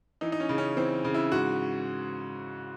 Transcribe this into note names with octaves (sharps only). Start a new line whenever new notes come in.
E3 D#4
D#4
C#4
C#3
C#4
E3 C4
C#3
E4
G#2 F#4